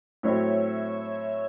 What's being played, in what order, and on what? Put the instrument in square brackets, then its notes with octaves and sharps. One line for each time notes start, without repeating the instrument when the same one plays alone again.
[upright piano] A2 F#3 C4 [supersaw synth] C#5 E5